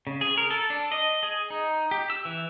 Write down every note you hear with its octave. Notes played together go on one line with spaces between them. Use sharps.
C#3
G#4
A#4
A4
D4
D#5
G#4
D#4
G4
E6
E3